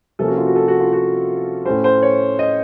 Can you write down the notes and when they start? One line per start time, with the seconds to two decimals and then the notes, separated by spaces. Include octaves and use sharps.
0.19 C3 F3 A#3 C#4 A4
0.28 F#4
0.37 F4
0.47 F#4
0.56 A4
0.68 F#4
0.80 F4
0.93 F#4
1.65 A2 A3 C#4 C5
1.84 C5
2.02 C#5
2.39 D#5